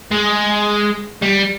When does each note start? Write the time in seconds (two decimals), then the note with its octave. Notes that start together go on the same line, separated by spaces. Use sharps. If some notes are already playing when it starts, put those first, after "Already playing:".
0.11 G#3
1.22 G3